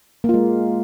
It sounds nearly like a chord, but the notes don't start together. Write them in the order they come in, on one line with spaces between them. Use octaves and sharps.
A#3 F4 G#3